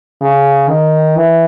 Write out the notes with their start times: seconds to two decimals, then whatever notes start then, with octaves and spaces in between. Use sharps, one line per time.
0.22 C#3
0.69 D#3
1.17 E3